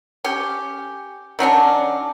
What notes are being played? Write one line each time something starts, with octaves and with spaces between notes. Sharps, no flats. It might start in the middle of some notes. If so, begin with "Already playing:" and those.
C#4 G4
D#3 F#3 C#4 D4